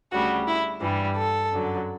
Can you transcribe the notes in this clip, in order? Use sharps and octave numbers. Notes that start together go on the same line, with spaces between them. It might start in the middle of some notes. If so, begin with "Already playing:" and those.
D2 C#3 G3 F#4
E4
G2 E3 G3
A4
F#2 D3 F#3